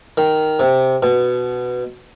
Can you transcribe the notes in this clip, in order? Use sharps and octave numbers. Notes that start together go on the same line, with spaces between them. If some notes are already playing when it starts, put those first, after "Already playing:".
D#3
C3
B2